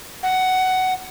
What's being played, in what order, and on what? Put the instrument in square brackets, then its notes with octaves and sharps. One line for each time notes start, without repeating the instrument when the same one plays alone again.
[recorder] F#5